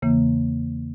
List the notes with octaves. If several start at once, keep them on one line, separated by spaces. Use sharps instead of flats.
E2 C#3 E3 A#3